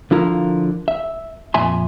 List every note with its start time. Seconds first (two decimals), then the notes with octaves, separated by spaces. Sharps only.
0.11 D3 F3 E4 F4 A#4
0.88 E5
1.54 F2 A#2 E5 G#5 C6